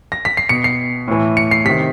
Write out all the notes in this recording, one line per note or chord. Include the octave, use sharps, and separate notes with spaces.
A#6
B6
C7
B2 C#7
C7
A2 E3
C#7
C7
C3 D#3 B6